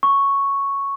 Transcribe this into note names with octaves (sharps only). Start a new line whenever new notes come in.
C#6